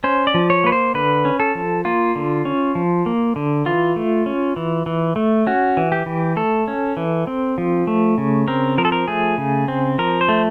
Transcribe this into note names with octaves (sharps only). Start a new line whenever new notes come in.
C#4 C5
D5
F3
C#5
A#3 B4
C5
D3 B4
C#4
A4
F3
A#3 F4
D3
C#4
F3
A#3
D3
E3 F4
A3
C#4
E3
E3
A3
C#4 F#4
E3
G4
E3
A3 A4
C#4
E3
C4
F3
A3
C#3
C4 A#4
F3 A#4
A4
A#4
A3 G#4
C#3
C4
F3 A#4
C5
A3